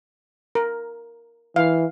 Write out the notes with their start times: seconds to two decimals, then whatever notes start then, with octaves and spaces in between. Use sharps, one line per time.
0.55 A#4
1.56 E3 F5